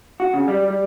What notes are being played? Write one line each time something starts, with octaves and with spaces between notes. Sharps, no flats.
F#4
C#3
G3
G3